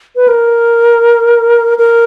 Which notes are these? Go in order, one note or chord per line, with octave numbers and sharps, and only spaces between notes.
B4
A#4
A#4